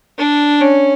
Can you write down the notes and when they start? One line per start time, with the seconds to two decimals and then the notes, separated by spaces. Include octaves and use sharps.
0.19 D4
0.61 C#4